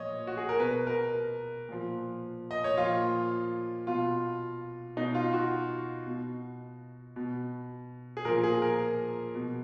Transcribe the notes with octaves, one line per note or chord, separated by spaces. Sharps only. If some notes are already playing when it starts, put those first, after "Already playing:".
Already playing: A#2 F3 C#5 D#5
F#4
G#4
A#4
B2 B4
A#4
A#2 F3
D#5
C#5
A#2 F3 F4
B2 F4
B2 D#4
F4
F#4
B2
B2
G#4
A#2 F3 A#4
G#4
A#4
B2